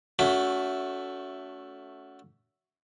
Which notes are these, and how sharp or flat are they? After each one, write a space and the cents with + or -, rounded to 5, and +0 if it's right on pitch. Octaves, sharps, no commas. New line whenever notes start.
A3 +0 C#4 +35 F#4 +0